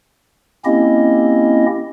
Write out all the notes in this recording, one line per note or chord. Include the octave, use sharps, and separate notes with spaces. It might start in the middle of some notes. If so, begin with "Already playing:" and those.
A#3 C4 C#4 E4 G4 D#5